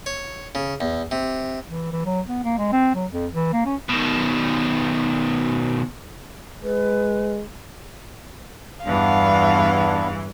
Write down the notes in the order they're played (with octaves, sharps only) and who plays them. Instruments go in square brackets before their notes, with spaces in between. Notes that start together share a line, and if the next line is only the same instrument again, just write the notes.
[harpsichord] C#5
C#3
E2
C3
[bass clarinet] E3
E3
F#3
B3
A#3
G#3
C4
F#3
F2
E3
A#3
C#4
[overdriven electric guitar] B2 D#3
[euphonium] G#3 [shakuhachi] B4
[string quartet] E2 G2 E3 [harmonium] B3 D4 [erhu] F5